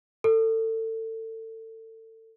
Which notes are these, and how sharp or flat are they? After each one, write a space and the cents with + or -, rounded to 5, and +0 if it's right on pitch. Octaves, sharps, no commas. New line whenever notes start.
A4 +30